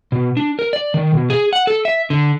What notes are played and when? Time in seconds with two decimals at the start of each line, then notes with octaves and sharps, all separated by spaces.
0.12 B2
0.37 D4
0.59 A#4
0.73 D5
0.94 D#3
1.14 B2
1.30 G#4
1.53 F#5
1.67 A4
1.85 E5
2.10 D3